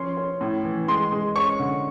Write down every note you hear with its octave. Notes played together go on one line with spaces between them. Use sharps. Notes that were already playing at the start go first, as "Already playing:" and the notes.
Already playing: F3 C#4 C6
C#4
A2
E3
G#3 C6
G#3
C#4 C#6
D3